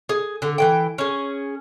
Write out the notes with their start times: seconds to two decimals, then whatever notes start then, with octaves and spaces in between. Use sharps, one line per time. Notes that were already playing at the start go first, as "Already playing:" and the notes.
0.09 G#4
0.42 D3
0.58 E3 G#3 G5
0.98 C#4 G#4